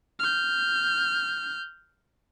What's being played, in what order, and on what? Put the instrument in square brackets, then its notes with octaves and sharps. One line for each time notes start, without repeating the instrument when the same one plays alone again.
[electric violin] F6 G6